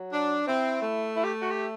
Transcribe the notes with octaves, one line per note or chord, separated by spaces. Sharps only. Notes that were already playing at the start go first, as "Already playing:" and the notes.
Already playing: F#3
D4
C4 E4
A3
E4
G4
F#4
G4